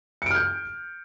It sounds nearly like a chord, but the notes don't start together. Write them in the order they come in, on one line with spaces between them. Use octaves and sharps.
C#7 D7 F6 G6